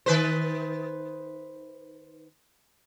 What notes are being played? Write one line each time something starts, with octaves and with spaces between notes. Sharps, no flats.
D#3 B4 C5